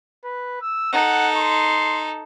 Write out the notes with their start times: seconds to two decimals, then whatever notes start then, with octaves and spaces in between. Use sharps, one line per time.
0.24 B4
0.61 E6
0.93 D#4 A4 F#5
1.36 C6